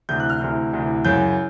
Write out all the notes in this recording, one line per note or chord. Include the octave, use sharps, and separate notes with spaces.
D2 C3 E3 G6
F#6
F6
D2 C3 E3
D2 C3 E3
F#2 C#3 E3 G6